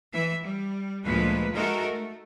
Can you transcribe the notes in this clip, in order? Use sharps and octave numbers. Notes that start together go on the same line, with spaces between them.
E3 E5
G3
D2 A#2 F3 G#3 A3 B4
G#3 D#4 F#4 A4 A#4 E5
A3